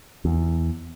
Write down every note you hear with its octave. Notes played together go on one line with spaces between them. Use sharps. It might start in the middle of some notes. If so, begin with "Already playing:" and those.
E2